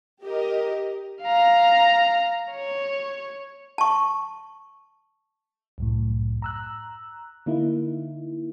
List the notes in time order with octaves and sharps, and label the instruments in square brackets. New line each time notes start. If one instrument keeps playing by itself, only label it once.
[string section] G4 A#4 D#5
[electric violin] F5 A#5
C#5
[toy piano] A5 C#6
[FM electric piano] C2 F#2 A2
A#5 E6 F#6
D3 A#3 D#4 E4